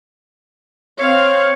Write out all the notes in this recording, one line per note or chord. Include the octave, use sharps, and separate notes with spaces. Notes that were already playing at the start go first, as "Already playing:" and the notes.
C4 C#5 F5